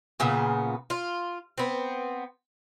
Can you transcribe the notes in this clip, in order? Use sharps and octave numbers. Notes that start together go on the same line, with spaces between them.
A#2 C#3 B3
F4
B3 C4